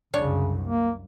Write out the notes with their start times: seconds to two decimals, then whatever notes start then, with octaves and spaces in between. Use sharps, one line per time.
0.14 C2 F#2 C#3 D4 C#5
0.67 A#3